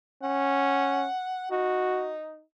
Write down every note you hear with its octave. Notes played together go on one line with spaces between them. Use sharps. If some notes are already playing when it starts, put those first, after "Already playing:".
C#4 F#5
D#4 F#4